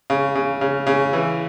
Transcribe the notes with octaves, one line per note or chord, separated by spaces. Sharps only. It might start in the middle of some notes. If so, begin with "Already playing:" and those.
C#3
C#3
C#3
C#3
E3